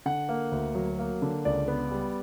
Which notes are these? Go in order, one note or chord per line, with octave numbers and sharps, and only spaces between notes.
D3 F#5
A#3
D2
F#3
A#3
D3
C#2 D5
B3
G3